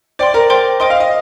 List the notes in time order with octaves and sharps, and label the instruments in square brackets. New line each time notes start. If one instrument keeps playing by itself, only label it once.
[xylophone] C5 G5 C6 [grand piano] D5
[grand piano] A#4
[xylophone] C5 G5 C6
[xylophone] C5 G5 C6 [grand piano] D#5
[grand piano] F5
D#5